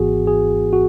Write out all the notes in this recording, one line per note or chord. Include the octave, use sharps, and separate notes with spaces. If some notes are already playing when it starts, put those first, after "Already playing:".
Already playing: G#1 G#2 E3 B3 F#4 G#4
G#4
F#4